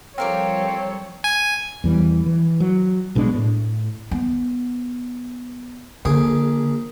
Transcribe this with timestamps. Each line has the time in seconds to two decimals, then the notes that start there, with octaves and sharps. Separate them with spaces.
0.18 F3 G3 C4 G4 A4 A#4 C#5 F5
1.24 G#5
1.84 E2 E3 G3
2.26 E3
2.60 F#3
3.15 A#1 B2 G#3 D4
3.35 A2
4.11 B3
6.05 A#1 D3 G#4 D6